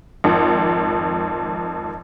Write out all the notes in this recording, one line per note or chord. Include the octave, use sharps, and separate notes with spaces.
G#1 F2